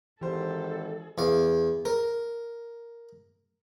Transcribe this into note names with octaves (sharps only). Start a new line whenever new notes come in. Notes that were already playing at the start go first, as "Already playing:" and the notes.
G#1 E3 G4 A4 C5
E2 F5
A#4